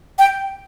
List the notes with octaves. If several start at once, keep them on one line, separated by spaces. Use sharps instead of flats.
G5